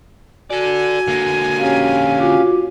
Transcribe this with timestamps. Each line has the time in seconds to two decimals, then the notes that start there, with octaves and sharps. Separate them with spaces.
0.50 F#4 A4 D5 G#5
1.08 D3 A#3
1.59 C#4 G4 F5
2.19 F4 F#4 D6